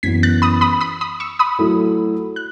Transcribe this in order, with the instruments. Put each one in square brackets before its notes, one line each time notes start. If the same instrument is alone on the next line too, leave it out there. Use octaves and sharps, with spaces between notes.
[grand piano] F#2 E3 B3 [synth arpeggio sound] G#6 B6
[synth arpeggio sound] F#6 A6
B5 D#6
B5 D#6
B5 D#6
B5 D#6
C#6 E6
B5 D#6
[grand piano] F#3 A3 E4 A4
[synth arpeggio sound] F#6